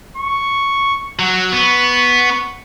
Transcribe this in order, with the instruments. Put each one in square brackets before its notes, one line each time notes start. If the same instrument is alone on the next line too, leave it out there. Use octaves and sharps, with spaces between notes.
[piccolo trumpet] C#6
[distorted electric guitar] F#3 [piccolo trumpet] F#5
[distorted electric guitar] B3 [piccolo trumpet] C#6